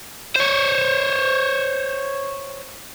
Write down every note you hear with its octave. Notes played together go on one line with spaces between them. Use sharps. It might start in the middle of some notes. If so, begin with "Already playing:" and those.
C5 C#5